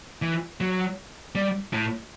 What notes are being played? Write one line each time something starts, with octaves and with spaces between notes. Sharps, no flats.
E3
F#3
G3
A2